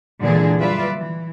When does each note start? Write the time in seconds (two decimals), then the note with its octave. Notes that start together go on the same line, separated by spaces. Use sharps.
0.22 A#2 D3 E3 G#3 D4 G#4
0.58 F#3 G3 F4 B4 D5 E5
0.98 E3